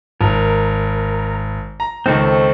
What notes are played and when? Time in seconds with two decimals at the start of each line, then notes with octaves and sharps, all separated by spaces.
0.21 G#1 A#4
1.80 A#5
2.06 C#2 D#3 C4 A4 C#6